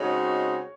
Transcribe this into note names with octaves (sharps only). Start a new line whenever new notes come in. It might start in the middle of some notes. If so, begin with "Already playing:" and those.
Already playing: C#3 G#3 C4 D#4 F#4 C#5